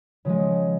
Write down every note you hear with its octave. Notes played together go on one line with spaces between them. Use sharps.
C#3 F3 G#3